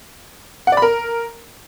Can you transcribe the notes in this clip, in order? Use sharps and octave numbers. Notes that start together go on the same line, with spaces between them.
F#5
D5
B5
A#4